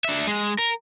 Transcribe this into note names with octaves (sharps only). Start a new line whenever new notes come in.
D4 E5
G#3
A#4